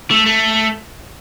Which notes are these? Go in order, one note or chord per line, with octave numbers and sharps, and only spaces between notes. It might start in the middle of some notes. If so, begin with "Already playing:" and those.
A3
A3